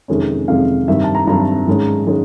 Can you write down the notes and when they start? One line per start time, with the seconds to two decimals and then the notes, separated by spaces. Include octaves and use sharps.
0.08 F2 C3 D#3 G#3 C#4
0.48 F2 C3 D#3 G#3 C#4 F5
0.88 G2 D#3 G3 C4 E5
1.04 A5
1.15 A#5
1.27 G2 D#3 G3 C4 A#5
1.67 G#2 D#3 G#3 C#4
2.07 D#3 G#3 C#4